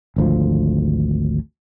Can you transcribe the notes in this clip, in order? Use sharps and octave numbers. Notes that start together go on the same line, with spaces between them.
G#1 D2 F3